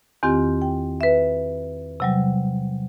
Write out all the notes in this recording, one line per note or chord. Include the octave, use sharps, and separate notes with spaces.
E2 D#3 C4 F4 G4
G5
B4 E5
C3 F#3 G3